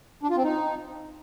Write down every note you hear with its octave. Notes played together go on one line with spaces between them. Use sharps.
D4
F4
C4
D#4